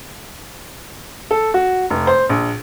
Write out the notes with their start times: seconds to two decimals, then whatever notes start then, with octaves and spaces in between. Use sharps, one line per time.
1.31 A4
1.54 F#4
1.90 F1
2.07 C5
2.29 A#1